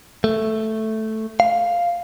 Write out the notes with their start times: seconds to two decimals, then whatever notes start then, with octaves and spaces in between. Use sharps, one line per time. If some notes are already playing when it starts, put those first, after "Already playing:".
0.24 A3
1.40 F5